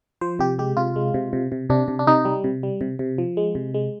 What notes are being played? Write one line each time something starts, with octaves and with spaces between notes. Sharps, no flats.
F3 C5
C3 G4
G#3 G4
C3 F4
G#3
C3
C3
C3
C3 D4
C3
D4
C3 D#4
G3
C3
G3
C3
C3
F3
G#3
C3
G#3